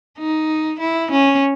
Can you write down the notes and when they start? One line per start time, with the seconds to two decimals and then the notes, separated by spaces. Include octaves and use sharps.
0.19 D#4
0.80 E4
1.11 C#4